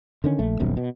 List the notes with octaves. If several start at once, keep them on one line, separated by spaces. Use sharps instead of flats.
D3 D#3 C#4
A#1 A3
D#1 B1 F#2 C3
B2